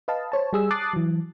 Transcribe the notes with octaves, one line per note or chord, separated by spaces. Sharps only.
B4 D#5 F5 A5
C5 C#5 A5
G3 G#4 E6
A5 D6 D#6 F#6 A6 C7
E3 F#3